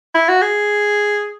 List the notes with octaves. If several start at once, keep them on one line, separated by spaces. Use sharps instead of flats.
E4
F#4
G#4